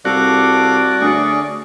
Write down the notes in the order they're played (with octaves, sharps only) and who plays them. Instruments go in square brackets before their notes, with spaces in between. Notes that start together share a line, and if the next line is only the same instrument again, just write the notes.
[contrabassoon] C2 [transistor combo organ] F#4 [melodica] A4 F5 D6 [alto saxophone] D5
[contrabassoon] D2 [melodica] C#4 G#4 C#6